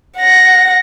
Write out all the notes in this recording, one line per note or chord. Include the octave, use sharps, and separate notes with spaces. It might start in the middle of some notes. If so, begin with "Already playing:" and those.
F#5 A#6